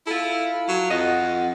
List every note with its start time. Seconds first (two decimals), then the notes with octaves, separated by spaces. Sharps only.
0.07 E4 F4 A4
0.68 F#3
0.90 F2 D#5 F#5